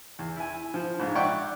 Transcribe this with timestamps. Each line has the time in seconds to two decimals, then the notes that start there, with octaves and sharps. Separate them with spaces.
0.19 E2
0.36 E4 G#5
0.74 F3
1.00 A#1 G#2
1.15 D5 E5 F#5 G5 C#6